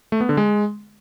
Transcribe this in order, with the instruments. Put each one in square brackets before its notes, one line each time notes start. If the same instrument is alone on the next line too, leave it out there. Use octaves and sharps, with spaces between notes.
[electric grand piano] A3
B3
D3
G#3